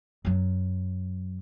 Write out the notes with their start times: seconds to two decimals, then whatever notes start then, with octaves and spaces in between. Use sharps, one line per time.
0.25 F#2 F#3